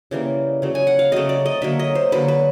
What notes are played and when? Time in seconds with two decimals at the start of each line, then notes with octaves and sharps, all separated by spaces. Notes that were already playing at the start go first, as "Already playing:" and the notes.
0.11 C#3 E3 G3 A#3
0.62 C#3 F#3 A3
0.75 G#5
0.87 F#5
0.99 F5
1.12 C#3 F#3 A3 D#5
1.29 D5
1.46 D#5
1.62 D3 F#3 A#3 E5
1.79 D#5
1.95 C5
2.12 D3 F#3 A#3 B4
2.28 B4